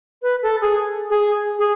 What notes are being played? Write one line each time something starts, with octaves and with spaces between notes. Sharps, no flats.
B4
A4
G#4
G#4
G#4